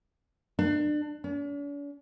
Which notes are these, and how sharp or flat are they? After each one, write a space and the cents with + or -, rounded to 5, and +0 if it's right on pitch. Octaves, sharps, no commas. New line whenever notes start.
D4 +30
D4 -45